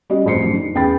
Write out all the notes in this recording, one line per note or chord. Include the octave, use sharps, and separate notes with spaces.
G3 C#4 F#4 D#5
A1 F2 C5 C7 C#7
F#2 D3
D#4
E2 C#4 G5 B5 A6